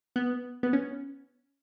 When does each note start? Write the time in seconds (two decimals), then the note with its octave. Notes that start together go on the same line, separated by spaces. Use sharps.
0.16 B3
0.63 B3
0.73 C#4